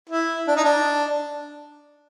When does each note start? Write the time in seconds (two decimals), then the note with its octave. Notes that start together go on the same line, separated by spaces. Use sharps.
0.09 E4
0.48 D4
0.56 D#4
0.64 D4